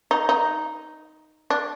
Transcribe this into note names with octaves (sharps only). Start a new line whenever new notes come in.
D#4
D#4
D4